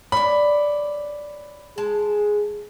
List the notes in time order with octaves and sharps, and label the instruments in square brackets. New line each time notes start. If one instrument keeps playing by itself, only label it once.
[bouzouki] C#5 D5 [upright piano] B5
[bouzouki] G#3 A5 [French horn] G#4